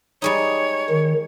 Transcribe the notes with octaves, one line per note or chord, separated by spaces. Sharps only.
G3 G#3 D#4 C#5
D#3